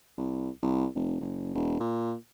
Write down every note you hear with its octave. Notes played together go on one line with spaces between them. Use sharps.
C2
C2
F1
F#1
E1
A#2